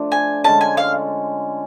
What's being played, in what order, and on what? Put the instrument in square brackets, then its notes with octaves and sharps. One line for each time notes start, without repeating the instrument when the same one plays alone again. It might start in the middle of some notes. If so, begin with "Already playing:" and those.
Already playing: [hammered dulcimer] F3 A3 D4
[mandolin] G#5
[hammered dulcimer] D3 G#3 C#4 [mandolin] A5
[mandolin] G#5
F5